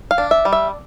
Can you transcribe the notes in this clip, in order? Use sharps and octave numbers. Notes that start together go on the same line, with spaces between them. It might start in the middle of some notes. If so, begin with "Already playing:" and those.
F5
D4
E5
G3
E5